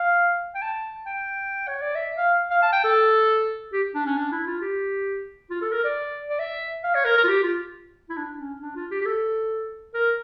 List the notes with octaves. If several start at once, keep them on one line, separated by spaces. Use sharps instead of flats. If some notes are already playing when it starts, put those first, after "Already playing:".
Already playing: F5
G5
A5
G5
C#5
D5
E5
F5
F5
A5
G5
A4
G4
D4
C#4
D4
E4
F4
G4
F4
A4
A#4
D5
D5
E5
F5
C#5
A#4
A#4
F4
G4
F4
E4
D4
C#4
D4
F4
G4
G4
A4
A#4